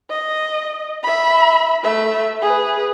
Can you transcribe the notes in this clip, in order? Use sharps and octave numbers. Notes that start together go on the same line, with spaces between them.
D#5
E5 B5
A3 E5
G#4 B4